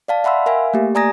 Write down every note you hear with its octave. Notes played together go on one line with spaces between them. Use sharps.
D5 F5 A5
E5 F#5 B5 C6 E6
A#4 E5 F5 G#5
A3 A#3 G4
D5 G#5 A#5 D#6 G#6 A#6